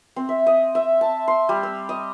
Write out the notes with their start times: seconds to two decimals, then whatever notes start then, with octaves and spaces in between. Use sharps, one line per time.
0.16 C4
0.29 E5
0.47 D#5
0.75 E5
1.01 A5
1.28 C6
1.49 G3
1.63 E6
1.89 D#5